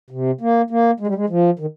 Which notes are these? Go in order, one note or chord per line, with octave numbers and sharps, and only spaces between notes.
C3
A#3
A#3
G#3
G3
G#3
F3
D#3